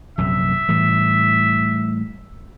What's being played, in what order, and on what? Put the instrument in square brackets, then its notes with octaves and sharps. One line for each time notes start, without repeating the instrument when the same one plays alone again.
[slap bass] A#1 F#2 C3 [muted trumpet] E5
[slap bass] A2 E3 G3